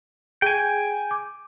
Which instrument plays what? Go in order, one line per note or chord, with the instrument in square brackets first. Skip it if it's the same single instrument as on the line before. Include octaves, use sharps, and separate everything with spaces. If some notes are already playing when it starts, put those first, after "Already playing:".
[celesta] G#4 [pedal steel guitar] G5 G#5
[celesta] D6